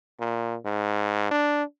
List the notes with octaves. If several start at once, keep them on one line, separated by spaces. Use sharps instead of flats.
A#2
G#2
D4